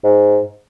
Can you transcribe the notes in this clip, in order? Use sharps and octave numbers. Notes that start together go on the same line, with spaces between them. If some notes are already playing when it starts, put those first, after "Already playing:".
G#2